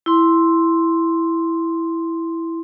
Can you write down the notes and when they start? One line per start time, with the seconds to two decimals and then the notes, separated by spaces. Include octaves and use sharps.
0.06 E4 C6